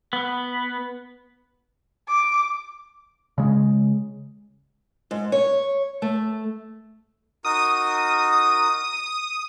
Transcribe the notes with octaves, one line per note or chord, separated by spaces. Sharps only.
B3
D6
C#3 G#3
G#2
C#5
A3
D#4 F#4 A#4 D#6